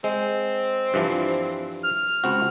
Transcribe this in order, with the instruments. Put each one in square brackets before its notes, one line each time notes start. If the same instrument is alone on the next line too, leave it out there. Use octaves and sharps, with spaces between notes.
[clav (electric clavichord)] G#3 [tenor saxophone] C4
[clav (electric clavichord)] G2 E3 F3
[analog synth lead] F6
[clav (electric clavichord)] C#2 C4 F#4